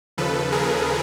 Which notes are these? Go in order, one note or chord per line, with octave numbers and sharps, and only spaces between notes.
D#2 C#3 F3 A4 B4
G#4 A#4